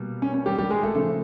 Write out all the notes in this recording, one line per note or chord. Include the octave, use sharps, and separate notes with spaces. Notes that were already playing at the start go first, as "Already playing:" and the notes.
Already playing: B2 G3 A#3
C#4
C#4
G3 G4
G3 G4
G#3 G#4
A3 A4
C#3 F3 A3 A4